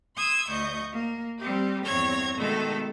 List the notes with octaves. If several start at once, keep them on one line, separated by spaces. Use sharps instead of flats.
C6 D#6 E6 G#6
D2 D#5 C#6 G6
A#3
G3 C4 G4
E2 G2 C4 C#5 G#6 A#6
B2 D#3 G#3 A3 A4